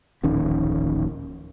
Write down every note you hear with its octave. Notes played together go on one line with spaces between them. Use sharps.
D1 A#1 D#3 C#4